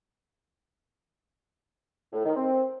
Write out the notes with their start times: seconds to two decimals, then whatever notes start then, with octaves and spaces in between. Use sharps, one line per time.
2.13 A2
2.25 D#3
2.36 C4